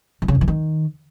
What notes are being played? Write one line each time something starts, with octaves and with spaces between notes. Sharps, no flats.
E3
C#3
E2
E3
D#3